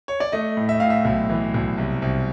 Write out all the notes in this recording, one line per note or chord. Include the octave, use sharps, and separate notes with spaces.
C#5
D5
A3 D#5
A2
E5
A2 F5
E5
B1
E3
B1
C2
C2